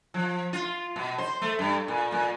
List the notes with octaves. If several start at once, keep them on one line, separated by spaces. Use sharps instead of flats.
F3
F4
B2
C5
A3
G2
A#2
A#2